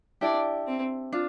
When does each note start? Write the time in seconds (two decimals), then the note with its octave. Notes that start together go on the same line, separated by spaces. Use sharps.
0.21 D4 E4 G4 D5
0.67 C4
1.12 D4 F4